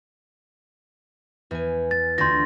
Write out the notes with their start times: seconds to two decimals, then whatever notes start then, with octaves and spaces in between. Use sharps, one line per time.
1.51 E2 G#5
1.91 A6
2.18 D2 F4 C6 G6 A#6